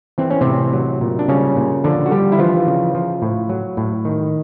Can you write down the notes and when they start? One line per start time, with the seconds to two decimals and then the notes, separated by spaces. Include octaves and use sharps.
0.18 E3 C4
0.31 C#4
0.41 A2 C3 C4
0.73 F#3
1.01 A#2
1.19 D4
1.28 C#3 G3 C#4
1.57 A#2
1.84 D3 F3 D4
2.06 F#4
2.11 D3 G3 G4
2.32 E4
2.39 E3 F3 F4
2.67 C#3
2.94 F3
3.22 A2
3.49 F#3
3.77 A2
4.05 D#3